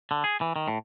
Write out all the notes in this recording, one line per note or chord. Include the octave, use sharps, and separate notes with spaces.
D3
G#4
E3
D#3
A2